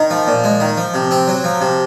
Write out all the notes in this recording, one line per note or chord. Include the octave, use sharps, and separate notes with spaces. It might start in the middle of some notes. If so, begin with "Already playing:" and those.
Already playing: D#3
F3
A#2
G#3
D#3
F3
C3
C4
F#3
F3
C3